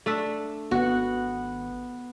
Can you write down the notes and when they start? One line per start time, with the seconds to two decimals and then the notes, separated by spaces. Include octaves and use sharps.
0.06 A3 D4 E5
0.71 G#1 B3 F#4 F#5